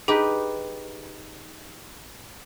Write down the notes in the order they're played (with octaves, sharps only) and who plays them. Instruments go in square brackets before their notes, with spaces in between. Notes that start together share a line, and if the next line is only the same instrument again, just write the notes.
[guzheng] D#4 G4 B4 [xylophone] G#4